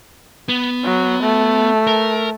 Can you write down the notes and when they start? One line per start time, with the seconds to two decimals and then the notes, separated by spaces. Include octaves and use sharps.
0.49 B3
0.84 F#3
1.23 A3
1.87 A#4